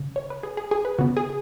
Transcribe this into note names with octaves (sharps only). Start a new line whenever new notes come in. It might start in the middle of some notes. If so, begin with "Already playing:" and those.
Already playing: C#3
C#5
B4
G#4
G#4
G#4
B4
C#3 B3 F#4
G#4